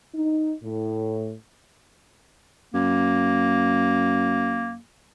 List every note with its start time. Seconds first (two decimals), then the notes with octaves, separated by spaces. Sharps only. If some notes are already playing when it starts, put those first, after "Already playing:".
0.15 D#4
0.63 A2
2.74 F#2 A#3